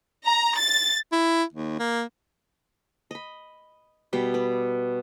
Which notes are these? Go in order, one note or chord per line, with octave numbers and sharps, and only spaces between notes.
A#5
A6
E4
D#2
A#3
D#5 B5
B2 G3 G5
B4 D5